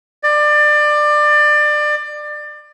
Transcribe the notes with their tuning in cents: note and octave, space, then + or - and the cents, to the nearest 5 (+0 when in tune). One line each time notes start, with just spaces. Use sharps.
D5 +25